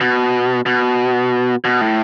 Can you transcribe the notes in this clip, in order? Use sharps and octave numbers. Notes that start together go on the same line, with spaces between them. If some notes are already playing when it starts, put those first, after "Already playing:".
B2
B2
B2
A2